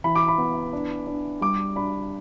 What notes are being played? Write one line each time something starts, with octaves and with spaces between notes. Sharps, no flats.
E3 B5
D6
B5
B3
D4
D4
G3 D6
D4 B5